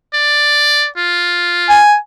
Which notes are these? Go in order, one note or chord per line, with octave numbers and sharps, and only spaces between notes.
D5
F4
G#5